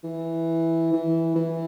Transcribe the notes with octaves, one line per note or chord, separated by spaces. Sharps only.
E3
E3
E3